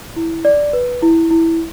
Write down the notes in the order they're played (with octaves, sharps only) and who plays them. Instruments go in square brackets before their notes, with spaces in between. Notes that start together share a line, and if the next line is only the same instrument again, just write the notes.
[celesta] E4
D5
B4
E4
E4